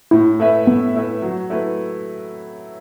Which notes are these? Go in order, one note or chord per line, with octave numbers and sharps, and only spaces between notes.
A2 E4
A3 E4 B4 E5
A2 B3
A3 E4 B4 E5
F#3
A3 E4 B4